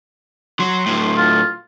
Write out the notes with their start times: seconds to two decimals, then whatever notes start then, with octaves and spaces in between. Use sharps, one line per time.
0.60 F#3 C6
0.86 A2 F#3
1.18 F4